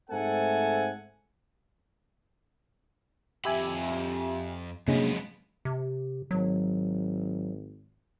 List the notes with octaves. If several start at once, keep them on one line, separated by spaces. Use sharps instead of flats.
G#2 A3 C4 A4 F#5 G#5
F2 G4 E5 G#5 B5
F2 C3 F#3 G#3 A#3 B3 C#4 D4
C3
G#1 F#3